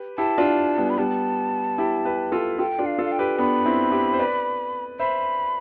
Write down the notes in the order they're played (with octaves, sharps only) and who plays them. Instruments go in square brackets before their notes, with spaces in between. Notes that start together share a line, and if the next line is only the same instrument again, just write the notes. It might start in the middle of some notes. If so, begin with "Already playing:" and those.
Already playing: [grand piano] G4 B4
[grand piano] E4 G4 [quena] A5
[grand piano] D4 F4
G3 B3
[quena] B5
[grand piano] G3 B3 [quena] A5
[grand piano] E4 G4
G4 B4
F4 A4
[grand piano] F4 A4 [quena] G5
[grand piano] D4 F4
[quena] F5
[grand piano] F4 A4
[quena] F5
G5
[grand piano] G4 B4
[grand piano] B3 D4 [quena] B5
[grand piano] C4 E4
E4 G4
C5
B4 D5
[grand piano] C5 E5 [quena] B5